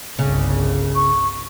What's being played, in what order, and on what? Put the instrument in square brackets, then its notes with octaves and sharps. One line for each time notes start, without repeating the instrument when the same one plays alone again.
[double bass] G1 C2 [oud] C#3
[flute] C#6